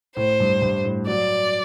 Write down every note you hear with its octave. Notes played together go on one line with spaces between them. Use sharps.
A2 C5
G2
G2
A2
F#3 D5